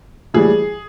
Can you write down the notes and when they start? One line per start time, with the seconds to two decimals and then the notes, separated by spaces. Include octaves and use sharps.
0.34 A2 E3 G3 G#4